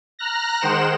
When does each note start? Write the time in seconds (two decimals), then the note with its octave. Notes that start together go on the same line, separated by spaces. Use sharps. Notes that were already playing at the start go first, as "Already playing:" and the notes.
0.19 A#5 F6 F#6 A#6
0.61 D#3 G#3 C5 F#5 G5 E7